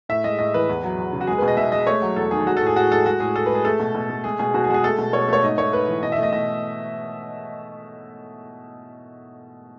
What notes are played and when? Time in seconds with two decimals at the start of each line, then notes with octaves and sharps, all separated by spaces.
0.09 A2 E5
0.24 G#3 D#5
0.39 A2 D#5
0.54 E3 B4
0.69 E2
0.83 F#3
0.98 E2
1.13 C#3
1.21 F#4
1.27 G#3 G#4
1.38 B2 B4
1.48 D#5
1.57 B2 E5
1.72 G#3 D#5
1.87 A3 C#5
2.02 F#3
2.16 E2 A4
2.31 D#3 G#4
2.46 G#3 F#4
2.57 A4
2.62 A2 G#4
2.76 A2 F#4
2.92 G#3 A4
3.05 G#3 F#4
3.20 A2 G#4
3.36 A2 A4
3.46 G#3 B4
3.55 G#4
3.65 A3 A4
3.80 B2
3.95 B2
4.10 A3
4.24 G#3 G#4
4.39 B2 G#4
4.54 B2 F#4
4.64 G#4
4.69 G#3 F#4
4.74 G#4
4.83 A3 A4
4.99 B2
5.13 B2 C#5
5.28 A3 C#5
5.43 G#2 D#5
5.58 A3 C#5
5.73 G#2 B4
5.88 E3
6.03 B2 D#5
6.12 E5
6.18 A3 D#5
6.32 B2 D#5